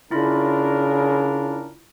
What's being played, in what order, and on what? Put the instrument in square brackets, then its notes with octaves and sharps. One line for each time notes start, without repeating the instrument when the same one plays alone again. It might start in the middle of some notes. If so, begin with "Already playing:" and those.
[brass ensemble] C#3 D4 A#4 [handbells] E4 F4 B5